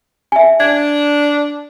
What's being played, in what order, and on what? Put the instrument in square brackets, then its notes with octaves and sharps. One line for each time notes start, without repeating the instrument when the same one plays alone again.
[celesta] E5 G#5
[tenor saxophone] D4 [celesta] G#6